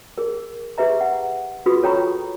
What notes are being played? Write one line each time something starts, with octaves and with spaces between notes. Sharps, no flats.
G#4 A#4
G4 G#4 B4 E5 A#5
F#5
F4 F#4 G#4 B4 B5 D#6
A4 C#5 G5 A#5 B5 C#6